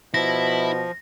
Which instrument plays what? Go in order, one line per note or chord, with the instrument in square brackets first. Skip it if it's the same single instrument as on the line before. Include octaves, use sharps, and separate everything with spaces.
[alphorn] B2 [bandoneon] F3 [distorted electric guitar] E4 [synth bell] A#6